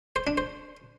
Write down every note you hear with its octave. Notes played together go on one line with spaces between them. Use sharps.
C5
D4
C5